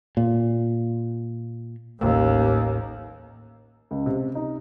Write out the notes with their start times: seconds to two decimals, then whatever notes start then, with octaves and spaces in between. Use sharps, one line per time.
0.17 A#2
2.00 A1 D#2
3.91 C#2
4.06 C3
4.35 D#4